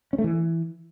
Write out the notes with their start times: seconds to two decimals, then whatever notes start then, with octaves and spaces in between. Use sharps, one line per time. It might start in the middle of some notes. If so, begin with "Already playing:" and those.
0.13 C#4
0.18 A3
0.24 E3